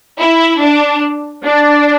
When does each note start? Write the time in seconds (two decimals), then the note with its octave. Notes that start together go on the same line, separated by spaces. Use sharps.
0.19 E4
0.60 D4
1.44 D4